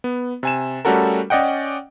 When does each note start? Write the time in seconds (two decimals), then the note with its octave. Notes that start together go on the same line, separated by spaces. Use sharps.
0.04 B3
0.43 C3 G#5 E7
0.85 G3 A3 C#4 F#4 A4 A#4
1.30 C#4 D5 D#5 F#5 G5